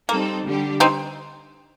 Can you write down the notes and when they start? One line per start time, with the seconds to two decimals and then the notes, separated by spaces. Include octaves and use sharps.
0.09 G3 A#3 C4 D#4 A4
0.44 D3 G3 D4 G4
0.80 C4 D#4